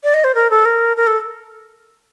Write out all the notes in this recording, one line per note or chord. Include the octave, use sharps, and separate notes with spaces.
D5
D#5
C5
A#4
A4
A#4
A#4
A4